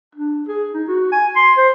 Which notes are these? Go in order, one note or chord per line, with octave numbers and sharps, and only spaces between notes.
D4
G#4
D#4
F#4
G#5
C6
C5